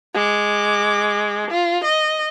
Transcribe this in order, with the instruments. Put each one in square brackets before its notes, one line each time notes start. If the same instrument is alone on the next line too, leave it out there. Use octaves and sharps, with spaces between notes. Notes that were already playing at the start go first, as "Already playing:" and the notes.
[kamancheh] G#3 D6
F4
D#5